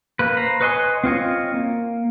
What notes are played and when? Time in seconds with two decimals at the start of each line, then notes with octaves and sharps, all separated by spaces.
0.19 A#3 B4
0.37 C5 A#5 B5
0.61 B4 C#5 D#5 G#5 C6
1.04 C4 F4 C#5 D#5
1.54 A#3